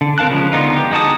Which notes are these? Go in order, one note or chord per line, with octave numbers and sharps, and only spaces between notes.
D3
C4 A#4 F5 A5 F#6
C#3 F3 G#3
D3 B3 D#4 F4
G4
G#3 D#4 F#4 A5 D#6